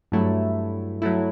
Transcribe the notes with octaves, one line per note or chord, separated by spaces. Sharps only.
G2 F#3 A3 E4
F#3 A3 E4